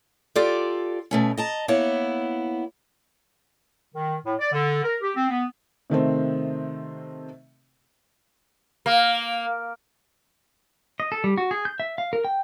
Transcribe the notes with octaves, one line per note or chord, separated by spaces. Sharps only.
F4 G4 A4 D5
B2 A3 C#4
D#5 A5 A#5
A#3 B3 E4 C#5
D#3
A2
D5
D3
A#4
G4
C4
B3
C3 D#3 A3 C4
A#3
D#5
A4
G3
F#4
G#4
G6
E5
F5
A#4
G5